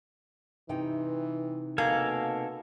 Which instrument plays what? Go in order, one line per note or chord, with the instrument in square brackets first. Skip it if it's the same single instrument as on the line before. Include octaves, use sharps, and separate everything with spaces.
[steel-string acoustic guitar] C3 D#4 G5 [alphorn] E3
[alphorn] B2 [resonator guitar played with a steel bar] A#3 [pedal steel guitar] A4 F5 G#5